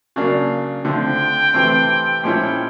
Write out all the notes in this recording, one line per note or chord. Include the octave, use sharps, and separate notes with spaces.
C#3 F#3 A#3 D4
D3 F3 A3 C4 G5
C3 E3 A3 C4
A#2 F3 G#3 C#4 E4 G5